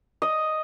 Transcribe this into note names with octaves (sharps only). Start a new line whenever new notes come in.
D#5